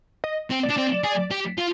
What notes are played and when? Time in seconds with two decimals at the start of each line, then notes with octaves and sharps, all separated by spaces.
0.24 D#5
0.51 C4
0.63 D5
0.70 D4
0.77 C4
1.04 G#4
1.31 G4
1.58 F4